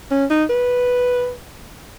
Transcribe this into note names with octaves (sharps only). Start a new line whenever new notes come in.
C#4
D#4
B4